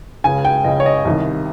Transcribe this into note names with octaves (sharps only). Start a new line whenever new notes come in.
C#2 C#3 G#5
G5
C#2 C#3 D#5
C#5
D#5
C2 C3 D#3